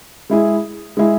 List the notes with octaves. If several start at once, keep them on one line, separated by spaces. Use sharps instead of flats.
G#3 E4 G#4
G#3 E4 G#4